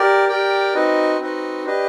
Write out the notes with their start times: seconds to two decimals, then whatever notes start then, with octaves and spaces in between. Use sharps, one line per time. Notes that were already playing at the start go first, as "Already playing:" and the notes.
Already playing: G4 A#4 D5
0.28 G4 A#4 D5 G5
0.74 C4 D#4 F#4 B4 D#5
1.19 C4 D#4 F#4 B4 D#5
1.65 D4 G4 B4 D#5